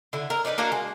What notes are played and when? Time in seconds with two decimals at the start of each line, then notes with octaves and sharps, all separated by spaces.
0.13 D3 E4
0.30 A#4
0.45 D4 D#4 F4 B4
0.58 A#3 D4 F#4 F5
0.72 G#3